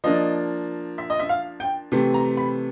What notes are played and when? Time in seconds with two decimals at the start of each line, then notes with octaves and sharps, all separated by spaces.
0.04 F3 A#3 D4 D#5
0.98 E5
1.10 D#5
1.20 E5
1.29 F5
1.60 G5
1.92 C3 E3 A3 C4
2.14 A#5
2.37 B5